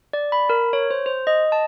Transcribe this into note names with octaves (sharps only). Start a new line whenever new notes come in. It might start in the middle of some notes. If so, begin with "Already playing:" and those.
D5
B5
A#4
C#5
C5
C5
D#5
A5